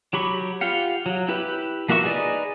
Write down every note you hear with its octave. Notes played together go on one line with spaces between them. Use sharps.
F#3 G4 B5 C#6
F4 G4 F5 F#5
F#3
E4 G4 B4
F3 A#3 F#4 E5 C#6
D#4 G#4 B4 D5 D#5